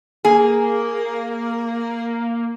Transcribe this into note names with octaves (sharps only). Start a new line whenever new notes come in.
A#3 G#4